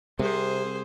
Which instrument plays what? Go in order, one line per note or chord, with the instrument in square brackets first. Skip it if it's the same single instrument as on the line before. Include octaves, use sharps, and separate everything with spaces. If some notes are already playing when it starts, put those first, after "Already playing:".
[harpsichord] C2 [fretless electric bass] C3 [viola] G#4 C5